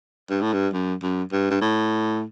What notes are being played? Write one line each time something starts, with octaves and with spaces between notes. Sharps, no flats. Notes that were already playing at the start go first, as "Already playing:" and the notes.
G2
A2
G2
F#2
F#2
G2
G2
A2